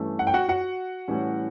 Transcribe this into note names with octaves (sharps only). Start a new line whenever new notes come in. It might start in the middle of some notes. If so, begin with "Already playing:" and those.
Already playing: G2 E3 A3 C#4
F#5
G5
F#4 F#5
F#4 F#5
A2 E3 G3 C#4